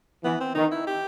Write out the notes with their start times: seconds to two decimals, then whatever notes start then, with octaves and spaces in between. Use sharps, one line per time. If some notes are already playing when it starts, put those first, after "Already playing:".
0.24 E3 B3
0.40 C4
0.55 D#3 D#4
0.71 E4
0.87 G4